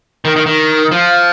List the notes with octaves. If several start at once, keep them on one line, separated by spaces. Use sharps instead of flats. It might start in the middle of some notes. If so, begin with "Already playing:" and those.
D#3
D#3
D#3
F3